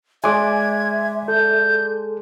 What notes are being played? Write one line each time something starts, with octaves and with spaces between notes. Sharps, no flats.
G#3 D5 E5 G#5 D6 G#6
A4 G6